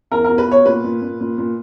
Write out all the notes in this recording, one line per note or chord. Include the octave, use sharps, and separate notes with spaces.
E2 A#4
B2 A#4
B4
B2 C#5
A#2 B4
A#2
A#2
A#2
A#2